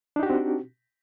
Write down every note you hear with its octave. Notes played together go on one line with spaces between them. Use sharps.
C4 D4 D#4 F#4 G4